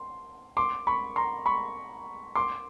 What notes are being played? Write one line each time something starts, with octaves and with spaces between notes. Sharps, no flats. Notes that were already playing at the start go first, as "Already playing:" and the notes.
Already playing: C6
C6 D6
B5 C#6
A#5 C6
B5 C#6
C6 D6